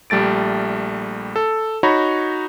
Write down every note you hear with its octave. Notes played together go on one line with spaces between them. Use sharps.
A#1 G3 A3 A6 D7
A4
D#4 F#4 C#5 A#5 B5